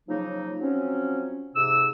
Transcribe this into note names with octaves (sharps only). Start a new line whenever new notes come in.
C#3 F3 F#3 A#3 D#4
F3 F#3 C4 C#4
F2 G#2 C3 E6